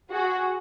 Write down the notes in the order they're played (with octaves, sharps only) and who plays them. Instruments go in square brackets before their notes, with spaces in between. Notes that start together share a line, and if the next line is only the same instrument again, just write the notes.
[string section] F#4 G#4